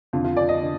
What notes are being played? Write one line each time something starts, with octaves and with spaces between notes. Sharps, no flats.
F2 D3 F4
F4
D5
D#5
D3